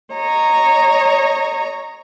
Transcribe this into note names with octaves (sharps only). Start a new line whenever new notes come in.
C#5 D#5 A#5